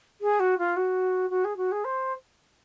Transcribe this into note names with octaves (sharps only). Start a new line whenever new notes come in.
G#4
F#4
F4
F#4
F#4
G#4
F#4
G#4
C5